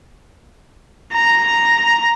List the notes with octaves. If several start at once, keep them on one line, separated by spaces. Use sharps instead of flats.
A#5